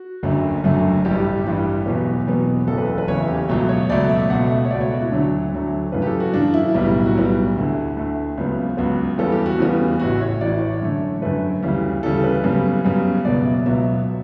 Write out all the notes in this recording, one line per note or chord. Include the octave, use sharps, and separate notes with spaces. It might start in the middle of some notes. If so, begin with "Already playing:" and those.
Already playing: F#4
F#1 F#2 D3 F#3 A3
F#1 F#2 D3 F#3 A3
A1 G2 E3 G3 G4
A1 G2 E3 G3
E2 B2 F#3 B3 G4
E2 B2 F#3 B3
F#1 E2 C#3 A4
B4
A4
B4
F#1 E2 C#3 C#5
E5
G4
C#2 B2 F#3 A3
C#5
C#2 B2 F#3 A3 D5
E5
C#2 B2 A3 F#5
E5
C#5
C#2 B2 A3 D5
C#5
F#4
E4
D2 D3 F#3 A3 D4
D2 D3 F#3 A3
F#2 C#3 E3 B4
G4
A4
F#4
F#2 C#3 E3 D4
E4
B1 A2 G3 B3
F#4
B1 A2 G3 B3 E4
D2 D3 A3
D2 D3 A3
C#2 C#3 F#3 B3
C#2 C#3 F#3 B3 F#4
E2 C#3 E3 G3 B3 A4
G4
F#4
E2 C#3 E3 G3 B3
A1 A2 E3 F#4
C#5
A1 A2 E3 D5
C#5
F#2 D3 A3
F#2 D3 A3 B4
D2 C#3 E3 G3
D2 C#3 E3 G3 A4
B4
F#2 C#3 G3 B3
F#2 C#3 G3 B3
C#2 B2 F#3 B3 D5
E5
C#2 B2 F#3 B3 E5